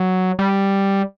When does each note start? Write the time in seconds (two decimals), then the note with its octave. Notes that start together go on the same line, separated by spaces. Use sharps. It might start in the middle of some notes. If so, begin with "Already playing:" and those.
Already playing: F#3
0.39 G3